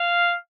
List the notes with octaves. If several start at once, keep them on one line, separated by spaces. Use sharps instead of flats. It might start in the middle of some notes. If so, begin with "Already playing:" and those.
Already playing: F5